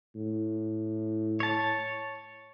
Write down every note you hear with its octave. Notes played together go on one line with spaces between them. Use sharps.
A2
C#5 A5